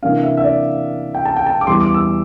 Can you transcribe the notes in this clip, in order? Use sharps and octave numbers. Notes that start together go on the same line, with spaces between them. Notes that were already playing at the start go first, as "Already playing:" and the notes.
C3 E3 A#3 D4 F5
E5
E5
D5
G5
A5
G5
A5
D6
E2 E3 G3 C6
D6
E6